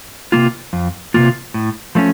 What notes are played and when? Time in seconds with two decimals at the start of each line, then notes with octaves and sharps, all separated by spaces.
0.32 C3 D#3 A#3 F4
0.73 F2
1.14 C3 D#3 A#3 F4
1.54 A2
1.95 F3 A3 C#4